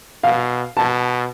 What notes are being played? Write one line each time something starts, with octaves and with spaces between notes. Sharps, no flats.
B2 F5
B2 A5